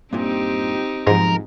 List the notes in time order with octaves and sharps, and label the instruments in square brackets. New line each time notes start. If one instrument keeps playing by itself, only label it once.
[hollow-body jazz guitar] G2 A#2 [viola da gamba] C4 D#4 G4
[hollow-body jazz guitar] B1 F3 [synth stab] G#2 [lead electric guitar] A#4